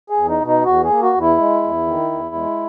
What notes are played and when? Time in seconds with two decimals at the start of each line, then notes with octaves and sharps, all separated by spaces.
0.10 G#4
0.16 E2
0.29 D#4
0.40 B2
0.47 D#4
0.65 E2 F#4
0.84 G#4
0.90 A#3
1.02 F#4
1.14 E2
1.21 E4
1.38 G#3
1.63 E2
1.87 D#3
2.12 E2
2.35 G#3